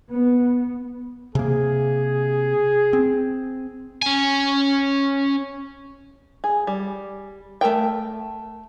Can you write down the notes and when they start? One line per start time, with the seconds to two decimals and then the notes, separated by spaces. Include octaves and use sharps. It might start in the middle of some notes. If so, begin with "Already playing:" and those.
0.10 B3
1.35 C3 A#3 G#4
2.93 C4
4.02 C#4 G#5
6.44 G#4
6.67 G3
7.61 A3 A4 A#4 G5